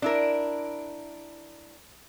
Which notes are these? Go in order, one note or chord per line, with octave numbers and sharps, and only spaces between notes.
D4 E4 A#4